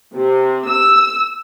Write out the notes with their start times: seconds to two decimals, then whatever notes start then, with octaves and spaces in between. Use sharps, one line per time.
0.15 C3
0.68 E6